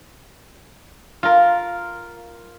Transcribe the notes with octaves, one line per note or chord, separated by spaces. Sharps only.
F4 A#4